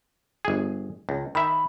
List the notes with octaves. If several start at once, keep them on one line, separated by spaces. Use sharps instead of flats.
G1 G#4
C#2
D#3 E5 B5